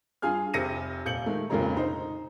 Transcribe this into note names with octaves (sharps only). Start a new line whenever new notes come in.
G2 F4 G#4 G#5 F6
F1 C3 A#6 C#7 D#7
D#1 G6 C#7 F#7
D#3 G#3 A3
F1 D2 A#2 C#3 G#3 A#5
D#4 C5 A#5